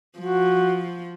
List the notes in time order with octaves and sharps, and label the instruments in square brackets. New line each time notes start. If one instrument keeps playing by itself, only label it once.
[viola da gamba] F3 [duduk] F#4